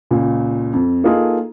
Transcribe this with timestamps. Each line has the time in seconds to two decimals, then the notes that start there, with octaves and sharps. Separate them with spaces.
0.11 C#2 A#2
0.73 F2
1.04 A#3 D#4 F4 G#4 A4